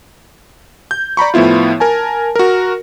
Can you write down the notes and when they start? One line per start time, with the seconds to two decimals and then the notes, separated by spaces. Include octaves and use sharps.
0.91 G6
1.17 D5 A#5 B5 C#6
1.34 A2 F3 B3 E4 F4
1.80 A#4 G#5 A5
2.36 F#4 A#4